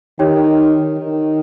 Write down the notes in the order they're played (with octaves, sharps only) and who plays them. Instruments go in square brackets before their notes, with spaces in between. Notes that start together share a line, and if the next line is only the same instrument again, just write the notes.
[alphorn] D#3 [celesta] D#4 G4 C#5 G5
[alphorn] D#3